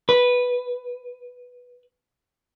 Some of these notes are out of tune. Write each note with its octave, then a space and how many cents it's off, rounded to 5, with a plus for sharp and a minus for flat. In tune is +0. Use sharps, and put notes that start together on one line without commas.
B4 -5